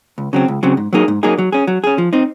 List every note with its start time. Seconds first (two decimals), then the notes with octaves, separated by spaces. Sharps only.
0.18 C#2
0.33 C#3 F#3 C4
0.48 C#2
0.63 C#3 F#3 C4
0.77 G#2
0.93 F#3 A#3 D#4 G#4
1.08 G#2
1.23 F#3 A#3 D#4 G#4
1.38 F#3
1.52 C#4 G#4
1.67 F#3
1.84 C#4 G#4
1.98 F3
2.13 C4 D#4